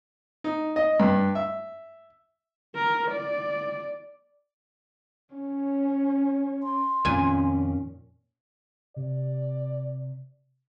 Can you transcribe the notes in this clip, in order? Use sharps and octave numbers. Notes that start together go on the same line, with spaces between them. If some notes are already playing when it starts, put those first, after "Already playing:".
D#4
D#5
G2
E5
A#4
D5
C#4 C#5
C6
F2 A#2 D#3 C#4 G#5
C3 D5